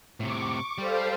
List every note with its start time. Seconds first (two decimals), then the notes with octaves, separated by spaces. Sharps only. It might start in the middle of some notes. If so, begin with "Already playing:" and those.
0.20 A2 C3 C#6 D6
0.78 G3 A4 C5 F5